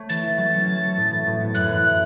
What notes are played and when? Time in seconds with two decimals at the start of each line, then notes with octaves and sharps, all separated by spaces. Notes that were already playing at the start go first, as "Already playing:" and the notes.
Already playing: A3 C#5
0.09 E3 A6
0.23 E4
0.38 F#3
0.53 C#4
0.67 F#3
0.82 A4
0.97 A2
1.11 E3
1.26 A2
1.40 B3
1.55 F#2 F#6
1.69 E3